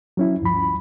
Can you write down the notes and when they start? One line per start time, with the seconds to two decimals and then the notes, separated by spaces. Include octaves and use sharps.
0.17 F#3 C#4 E4
0.42 D2 G2 F3 B5